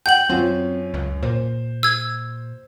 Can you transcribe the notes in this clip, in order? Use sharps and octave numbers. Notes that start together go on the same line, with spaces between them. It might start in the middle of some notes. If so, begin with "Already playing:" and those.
F#5 G5 G6 F#7
F#2 C4 C#4 F4
C#2
A#2 C5
E6 G#6